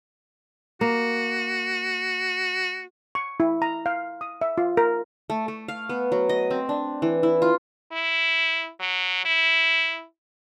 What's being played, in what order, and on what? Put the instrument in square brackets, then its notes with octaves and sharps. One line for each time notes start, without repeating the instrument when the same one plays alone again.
[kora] A#3 [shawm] F#4
[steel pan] C#6
E4
A#5
F5
D#6
E5
F4
A#4
[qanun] A3
A3
F5
B3
F#3
D#5
C4
D4
E3
E4
F4
[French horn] E4
F#3
E4